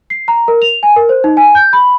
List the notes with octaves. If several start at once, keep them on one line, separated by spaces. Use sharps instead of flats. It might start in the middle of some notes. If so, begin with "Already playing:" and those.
C7
A#5
A#4
F7
G#5
A#4
C5
D#4
G#5
G6
B5